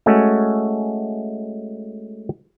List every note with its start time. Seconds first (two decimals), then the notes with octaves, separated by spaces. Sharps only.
0.06 G#3 A3 C#4 F#4